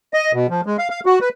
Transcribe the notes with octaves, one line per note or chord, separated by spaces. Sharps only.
D#5
B2
F3
G#3
F5
F5
F#4
B4